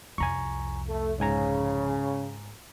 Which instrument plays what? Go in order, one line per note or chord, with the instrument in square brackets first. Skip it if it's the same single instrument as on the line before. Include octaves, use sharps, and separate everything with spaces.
[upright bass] C2 F2 [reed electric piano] G#5 A#5 C#6
[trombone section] A3
[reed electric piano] G#2 G#5 A#5 [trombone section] C#3